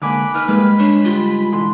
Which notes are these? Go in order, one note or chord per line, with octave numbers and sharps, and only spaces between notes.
D3 G#3 A#3 G#5 B5 D6 F#6
D#4 B4 F6
G3 G#3 A#3 B4
D4 B4 C#5
G#2 D3 G3 F4
B2 D3 E3 C6